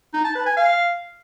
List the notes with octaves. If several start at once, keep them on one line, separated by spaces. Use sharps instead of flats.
D#4
A5
B4
G#5
F5